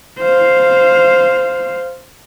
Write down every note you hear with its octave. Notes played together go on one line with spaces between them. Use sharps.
C5 F5